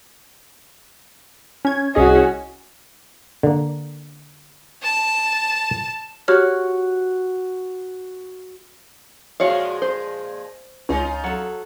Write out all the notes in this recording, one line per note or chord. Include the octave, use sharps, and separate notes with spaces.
C#4 G#6
C2 C#4 F#4 G#4 D#5
D3 A#3
A5
F#4 G4 C#5 F6
A#2 F3 G#3 F#4 C#5 F5
C5
C#2 C#4 D#4 F4
F#3 A4